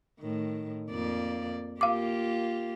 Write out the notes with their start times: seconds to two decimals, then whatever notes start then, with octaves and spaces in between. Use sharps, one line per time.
0.20 A2 D#3
0.90 F2 A#3 D5
1.81 A#3 F4 G4 F5 D6